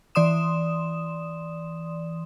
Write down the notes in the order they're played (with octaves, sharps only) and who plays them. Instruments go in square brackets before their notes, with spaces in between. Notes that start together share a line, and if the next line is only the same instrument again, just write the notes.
[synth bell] E3 D5 C6 D#6 E7